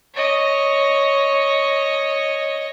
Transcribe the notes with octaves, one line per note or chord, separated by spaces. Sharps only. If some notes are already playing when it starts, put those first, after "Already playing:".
C#5 D#5